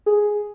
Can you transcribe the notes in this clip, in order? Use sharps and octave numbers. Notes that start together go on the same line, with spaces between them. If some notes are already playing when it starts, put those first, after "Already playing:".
G#4